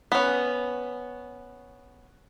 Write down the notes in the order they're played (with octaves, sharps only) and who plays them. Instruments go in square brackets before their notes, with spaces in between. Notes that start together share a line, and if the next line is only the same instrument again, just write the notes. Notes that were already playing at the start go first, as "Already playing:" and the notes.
[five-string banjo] B3 C#4